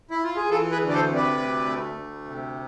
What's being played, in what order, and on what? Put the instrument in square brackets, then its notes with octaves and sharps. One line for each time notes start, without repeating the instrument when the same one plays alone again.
[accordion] E4
F4
G#4
E3 F4 A4
G#4 B4
D2
D5
A4 C5
C3
B4 D5
D2
A3
D2
C3